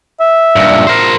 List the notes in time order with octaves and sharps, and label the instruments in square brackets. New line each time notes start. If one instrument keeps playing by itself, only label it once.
[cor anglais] E5
[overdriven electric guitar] G2 A#2
A#4 C5